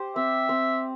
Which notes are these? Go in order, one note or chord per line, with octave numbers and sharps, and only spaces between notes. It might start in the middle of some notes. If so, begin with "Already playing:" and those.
Already playing: G4 C5
C4 E5
C4